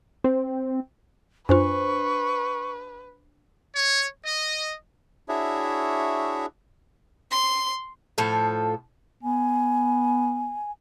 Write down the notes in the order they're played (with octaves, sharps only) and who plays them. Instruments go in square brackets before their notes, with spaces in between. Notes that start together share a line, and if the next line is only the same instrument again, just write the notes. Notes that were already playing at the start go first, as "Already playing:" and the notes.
[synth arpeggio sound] C4
[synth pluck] F#2 F4 [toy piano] D4 C5 [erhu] B4 [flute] C#6
[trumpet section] C#5
D#5
[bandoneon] D4 E4 F#4 G#4 C#5 E5
[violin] C6
[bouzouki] A2 F3 A4
[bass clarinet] B3 [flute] G#5